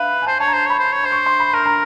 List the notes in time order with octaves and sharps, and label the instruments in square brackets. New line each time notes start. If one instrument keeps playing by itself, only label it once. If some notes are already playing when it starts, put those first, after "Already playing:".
Already playing: [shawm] B4 [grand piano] E5 F5
[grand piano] G#5
[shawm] C5 [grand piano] A5
[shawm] C#5 [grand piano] A5
[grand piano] A#5
[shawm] C5
[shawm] C#5 [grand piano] B5
[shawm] C5
C#5
[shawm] C5 [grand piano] C6
[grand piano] C#6
C6
B5
[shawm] A#4 [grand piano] A#5
[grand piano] A#5